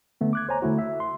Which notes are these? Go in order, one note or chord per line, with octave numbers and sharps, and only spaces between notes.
D3 A3 B3
D6 F#6 G#6
C5 C#5 G#5 A#5
D3 A3 E4 F#4
E5
C6